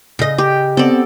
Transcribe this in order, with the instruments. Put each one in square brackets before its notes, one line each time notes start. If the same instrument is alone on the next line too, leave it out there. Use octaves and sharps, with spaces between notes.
[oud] C#3 D#5
[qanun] G4
[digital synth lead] B3 [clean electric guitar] C4 [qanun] A4 D5